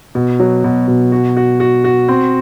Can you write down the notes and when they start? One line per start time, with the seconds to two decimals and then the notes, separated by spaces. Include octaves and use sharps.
0.15 B2
0.40 F#3
0.64 B2
0.87 B2
1.12 F#4
1.37 F#4
1.60 F#4
1.84 F#4
2.08 C4